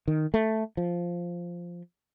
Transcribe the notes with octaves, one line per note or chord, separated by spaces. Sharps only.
D#3
A3
F3